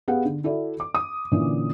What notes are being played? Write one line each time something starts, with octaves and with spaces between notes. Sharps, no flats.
B3 G4 G#4 F5 F#5
D3
E4 F#4 A4 D5 E5
D6
D#6
A#2 D3 E3 C#4